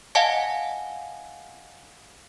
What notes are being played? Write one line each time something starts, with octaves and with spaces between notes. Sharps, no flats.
D#5 F5 F#5 G#5 A5